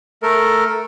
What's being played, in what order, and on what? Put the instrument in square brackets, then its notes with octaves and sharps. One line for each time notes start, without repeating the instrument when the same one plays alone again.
[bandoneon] A3 A4 A#4